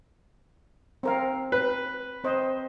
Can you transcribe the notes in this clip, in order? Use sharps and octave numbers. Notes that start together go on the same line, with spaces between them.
C4 A#4 F5
B4
C4 C5 D#5